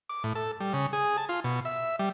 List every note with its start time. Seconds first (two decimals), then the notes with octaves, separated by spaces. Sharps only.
0.09 D6
0.24 A2
0.35 A4
0.60 G3
0.73 C#3
0.93 G#4
1.17 A5
1.29 F4
1.44 B2
1.65 E5
1.99 G3